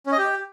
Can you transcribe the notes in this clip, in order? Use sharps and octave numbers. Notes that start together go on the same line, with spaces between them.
C#4
D#5
G4